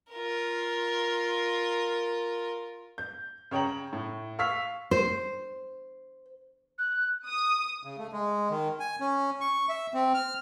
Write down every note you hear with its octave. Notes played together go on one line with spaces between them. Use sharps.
F4 A#4
G6
C#3 C#5 G5 A#5 F#7
A2
F5 C#6 E6 F6 B6
C5
F#6
D#6
C#3
A3
G#3
D#3
G#5
C#4
C#6
E5
C4
F6